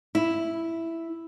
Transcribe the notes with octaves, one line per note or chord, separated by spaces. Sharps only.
E4